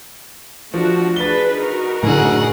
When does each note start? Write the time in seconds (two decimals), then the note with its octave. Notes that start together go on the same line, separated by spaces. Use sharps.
0.74 F3 A3 D4 F#4
1.16 D4 G#4 B4 A6 G7
1.61 D#4 F#4 A#4
2.03 F#1 A2 D3 G#4 F#5